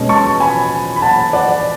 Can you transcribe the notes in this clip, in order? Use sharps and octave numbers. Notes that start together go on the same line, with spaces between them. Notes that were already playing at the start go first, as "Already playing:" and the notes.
Already playing: B2 G#3 C#4
A5 C#6
G#5 B5
B5
F#5 A5
D5 F#5